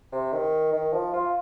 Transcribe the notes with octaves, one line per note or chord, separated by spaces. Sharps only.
C3
D#3
D#3
F3
F4